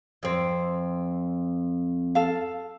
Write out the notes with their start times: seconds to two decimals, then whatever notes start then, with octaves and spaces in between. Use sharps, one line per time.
0.23 F2 C4
2.15 A4 F5